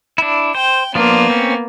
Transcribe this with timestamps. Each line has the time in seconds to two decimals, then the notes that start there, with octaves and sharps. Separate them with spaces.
0.18 D4 E4
0.55 C5 G5
0.95 F3 A#3 B3 D4 F4
1.30 C4 C#4